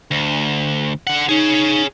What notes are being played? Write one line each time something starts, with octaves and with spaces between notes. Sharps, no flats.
D2
D3 F#5
D#4 G#4 C#5